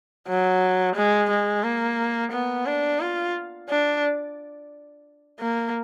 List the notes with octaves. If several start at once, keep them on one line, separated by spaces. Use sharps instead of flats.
F#3
G#3
G#3
A#3
B3
D4
F4
D4
A#3